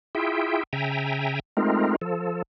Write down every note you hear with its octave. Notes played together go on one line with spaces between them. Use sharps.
E4 F4 G#4 E5 G5
C#3 E5 G5 G#5 A#5
G#3 A3 C4 D#4 F4 A#4
F3 A4